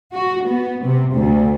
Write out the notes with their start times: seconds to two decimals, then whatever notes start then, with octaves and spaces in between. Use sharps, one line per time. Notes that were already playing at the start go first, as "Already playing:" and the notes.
0.14 F#4
0.48 B3
0.85 C3
1.14 D2